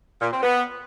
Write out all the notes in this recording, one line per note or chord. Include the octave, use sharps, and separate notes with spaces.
A#2
C4
B3